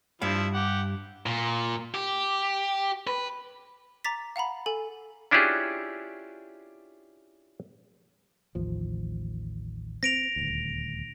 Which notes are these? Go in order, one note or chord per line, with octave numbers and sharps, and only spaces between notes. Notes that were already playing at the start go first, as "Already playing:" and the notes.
G2 F3 E4 F5
G4 F#5
A#2
G4
B4
A#5 D6 A6 B6
F5 F#5 A#5 B5
A4 G#5
C#4 D4 E4 F4 G4 G#4
A1 D#2 F3
C4 A#6 D7 F7
D#1 D2